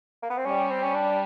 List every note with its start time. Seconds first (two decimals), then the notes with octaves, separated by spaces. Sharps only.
0.23 A#3
0.30 B3
0.38 C4
0.45 G3 C#4
0.71 C4
0.83 C#4
0.95 D4